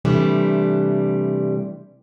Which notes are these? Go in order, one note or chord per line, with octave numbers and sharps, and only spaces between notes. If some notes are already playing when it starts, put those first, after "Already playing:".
C3 E3 G3 A3 D4